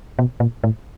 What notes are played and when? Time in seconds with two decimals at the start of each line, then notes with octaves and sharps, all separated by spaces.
0.19 B2
0.40 A#2
0.64 A2